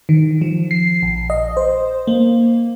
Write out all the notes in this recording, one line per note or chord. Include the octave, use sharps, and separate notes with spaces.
D#3
F3
C7
A#1
D#5
C5
A#3